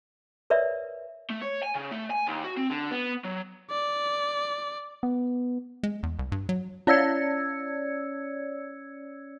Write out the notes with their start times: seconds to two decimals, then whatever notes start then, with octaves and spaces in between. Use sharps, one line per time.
0.50 A#4 B4 C#5 D5 E5
1.30 A3
1.41 C#5
1.63 G#5
1.75 C#3
1.92 A3
2.11 G#5
2.27 D#2
2.44 F#4
2.57 C4
2.70 D3
2.91 B3
3.25 F#3
3.70 D5
5.03 B3
5.83 G#3
6.03 E2
6.19 C2
6.32 G2
6.49 F#3
6.87 C#4 C#5 D5 E6 G#6 C#7